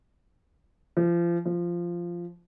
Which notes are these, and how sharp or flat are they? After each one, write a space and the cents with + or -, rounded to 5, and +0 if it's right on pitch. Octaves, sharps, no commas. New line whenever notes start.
F3 -30
F3 -10